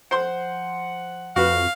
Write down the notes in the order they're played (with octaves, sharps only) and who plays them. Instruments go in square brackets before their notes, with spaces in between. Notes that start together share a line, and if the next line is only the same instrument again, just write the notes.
[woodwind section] F3 F#5 [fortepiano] C5 C6
[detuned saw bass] F2 [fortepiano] F#4 B4 [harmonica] F5